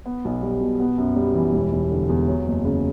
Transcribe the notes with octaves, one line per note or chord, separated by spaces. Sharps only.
B3
B1
G3
B2
B3
F#2
G3
E3
E1
E1
D3
E2
F#3
F#1
C#3